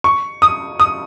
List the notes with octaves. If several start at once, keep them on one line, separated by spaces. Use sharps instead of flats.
C#6
D#6
D#6